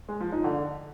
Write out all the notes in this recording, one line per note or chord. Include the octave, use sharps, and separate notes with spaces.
G#3
F3
D#4
D3